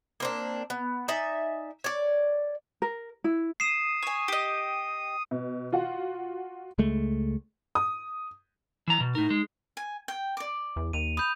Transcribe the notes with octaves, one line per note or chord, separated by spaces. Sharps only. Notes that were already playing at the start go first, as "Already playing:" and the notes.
A#3 C4 D4
B3
D#4 D5 E5 G#5
C#5 D5
A#4
E4
D#6 C7 E7
C#5 G#5
G4 D#5
B2
F4 F#4 F#5
C#2 G#3 A3
D#6
E3 A#5
B2
A2 D#4 A#4
G#3
G#5
G5
D5 D6
E2
D#2 D#7 F7
B5 D#6 G6 F7